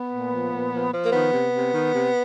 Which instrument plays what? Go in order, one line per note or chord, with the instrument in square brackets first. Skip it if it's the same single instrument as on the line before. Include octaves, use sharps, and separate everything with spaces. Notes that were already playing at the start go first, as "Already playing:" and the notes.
Already playing: [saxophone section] B3
A#2
F3
A#2
F3
F3
A#3
D#3 B3
C3
C3
D#3
C3